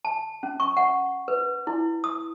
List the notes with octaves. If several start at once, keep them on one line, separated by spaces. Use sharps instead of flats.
A5
C#4
C#6
F#5
B4
E4
D#6